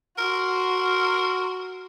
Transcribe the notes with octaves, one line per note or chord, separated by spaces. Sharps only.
F#4 A#4 C6